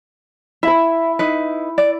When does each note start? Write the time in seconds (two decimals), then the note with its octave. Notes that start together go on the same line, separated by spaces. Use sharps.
0.63 E4 E5 B5
1.19 D#4 B4
1.78 D5